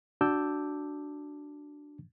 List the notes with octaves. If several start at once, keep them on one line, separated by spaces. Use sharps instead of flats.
D4 F#4 A5 D6 E6 G6